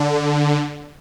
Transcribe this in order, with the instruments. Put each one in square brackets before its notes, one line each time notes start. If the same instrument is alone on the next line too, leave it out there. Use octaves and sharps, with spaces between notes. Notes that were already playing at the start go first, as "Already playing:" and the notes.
Already playing: [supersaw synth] D3